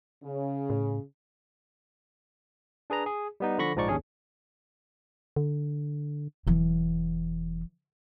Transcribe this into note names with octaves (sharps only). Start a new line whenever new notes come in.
C#3
A2
D4 G#4 B4 A#5
G#4
G3 B3 D#4
D3 F3 B5 C#6 A#6
A#1 G#2 F3 D#4 D5 C#6
D#2 C#4 D4 G#4 C#5
D3
E1 E3 F#3